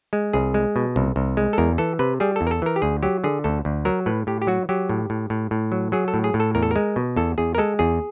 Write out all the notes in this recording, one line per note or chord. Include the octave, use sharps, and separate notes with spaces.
G#3
C2 G#4
G#3
B2
C2
C2
G#3
A4
E2 A#4
E3 A4
C3 B4
G3 G#4
E2 A4
A#4
A4
E3 A#4
G4
D2 G#4
F#3 G4
D3 G#4
D2 A4
D2
F#3 A#4
A2 B4
A2 G4
G4
F#3 F#4
F#3 G4
A2
A2
A2
A2
F#3
F#3 G#4
A4
A2
G#4
A2
A4
E2 A#4
A4
G#3 A#4
B2
E2 A4
E2 G#4
A#4
G#3 A4
E2 G#4